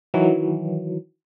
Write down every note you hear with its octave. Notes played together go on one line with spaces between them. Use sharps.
D#3 E3 F#3